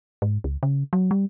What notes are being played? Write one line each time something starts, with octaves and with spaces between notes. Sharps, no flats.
G#2
C#2
C#3
F#3
G3